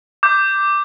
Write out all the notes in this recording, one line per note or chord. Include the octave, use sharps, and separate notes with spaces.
D6 G6